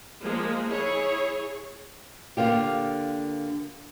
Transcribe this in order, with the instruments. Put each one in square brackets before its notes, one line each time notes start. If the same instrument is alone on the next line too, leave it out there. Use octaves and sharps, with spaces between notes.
[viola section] F3 G#3 A#3
E4 G#4 C#5
[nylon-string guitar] D3 A#3 F4 G4